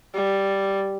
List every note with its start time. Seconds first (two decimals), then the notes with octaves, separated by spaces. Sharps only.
0.14 G3